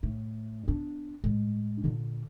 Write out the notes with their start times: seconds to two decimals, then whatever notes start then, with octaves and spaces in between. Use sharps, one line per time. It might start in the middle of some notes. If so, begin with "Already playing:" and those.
0.03 A2
0.68 B3 D4
1.24 A2 G#3
1.84 A#2 D3